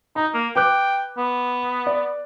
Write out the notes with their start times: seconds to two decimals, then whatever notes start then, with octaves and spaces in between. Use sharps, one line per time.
0.16 D#4 A#5
0.34 A#3
0.56 B4 G5 D6 F#6
1.18 B3
1.87 D5